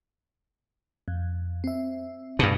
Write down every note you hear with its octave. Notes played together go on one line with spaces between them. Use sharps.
F2
C4 E5
G2 B2